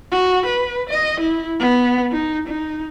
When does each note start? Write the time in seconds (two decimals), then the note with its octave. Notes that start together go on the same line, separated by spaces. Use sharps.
0.11 F#4
0.46 B4
0.89 D#5
1.20 E4
1.59 B3
2.12 D#4
2.48 D#4